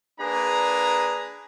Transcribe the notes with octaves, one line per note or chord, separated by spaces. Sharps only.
A#3 D4 G#4 B4 A#5